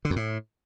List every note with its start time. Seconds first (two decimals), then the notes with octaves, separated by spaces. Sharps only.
0.05 D3
0.10 F2
0.16 A2